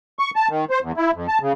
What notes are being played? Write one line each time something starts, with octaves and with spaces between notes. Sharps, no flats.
C#6
A5
D#3
C5
E2
E4
F2
A5
C#3